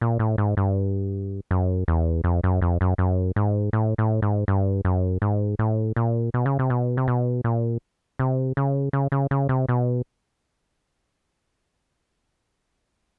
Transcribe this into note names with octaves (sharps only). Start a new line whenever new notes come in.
A#2
A2
G#2
G2
F#2
E2
F2
F#2
F2
F#2
F#2
G#2
A2
A2
G#2
G2
F#2
G#2
A2
A#2
B2
C#3
C3
B2
C3
B2
A#2
C3
C#3
C#3
C#3
C#3
C3
B2